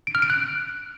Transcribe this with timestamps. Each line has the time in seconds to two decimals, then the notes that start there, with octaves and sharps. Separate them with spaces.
0.07 D7
0.15 F6
0.22 D7
0.30 F#6